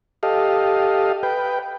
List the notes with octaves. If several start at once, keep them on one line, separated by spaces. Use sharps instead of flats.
G4 A4 D#5 F5
B4 G5